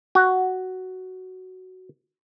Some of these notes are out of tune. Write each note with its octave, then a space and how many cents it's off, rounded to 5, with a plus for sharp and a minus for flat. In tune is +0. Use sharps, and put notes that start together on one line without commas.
F#4 +5